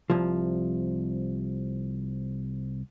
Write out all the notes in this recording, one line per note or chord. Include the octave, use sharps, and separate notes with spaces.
C2 F3